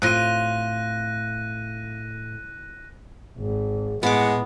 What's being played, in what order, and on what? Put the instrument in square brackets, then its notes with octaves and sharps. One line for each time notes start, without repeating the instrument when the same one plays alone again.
[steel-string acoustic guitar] A2 [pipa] C3 F4 [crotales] F#6 A#6 D#7
[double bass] G#1
[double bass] A2 [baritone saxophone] G#3 [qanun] B3 D6 [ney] F#5